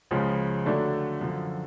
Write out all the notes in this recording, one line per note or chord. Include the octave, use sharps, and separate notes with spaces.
C#2 C#3 F3 G#3
D3 F#3 A3 D4
F#2 D3 F3